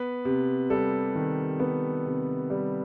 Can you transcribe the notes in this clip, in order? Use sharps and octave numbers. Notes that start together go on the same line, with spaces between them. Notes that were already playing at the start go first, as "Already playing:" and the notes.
Already playing: B3 B4
C3
G3 A4
D#3
B3
C3
G3